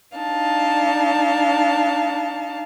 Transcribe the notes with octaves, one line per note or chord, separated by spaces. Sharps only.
D4 D#4 F5 A5